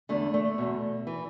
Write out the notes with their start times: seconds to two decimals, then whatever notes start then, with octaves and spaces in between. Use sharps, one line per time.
0.09 E2 D3 A3
0.34 A3
0.58 E2 B2
1.07 E3